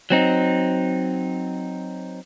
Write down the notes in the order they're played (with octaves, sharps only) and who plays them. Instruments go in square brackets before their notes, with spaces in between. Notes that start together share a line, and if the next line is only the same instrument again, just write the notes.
[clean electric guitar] F#3 C4 D#4